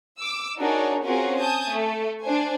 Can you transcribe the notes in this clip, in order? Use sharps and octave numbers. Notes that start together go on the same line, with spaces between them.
D6 E6
D4 D#4 F#4 G#4 A#4 C#5
C4 C#4 F4 F#4 G#4 A#4
G#5 A5 D#6 G6
A3 A4
D4 C5 G#5